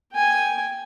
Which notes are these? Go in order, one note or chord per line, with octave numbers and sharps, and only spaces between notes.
G5 G#5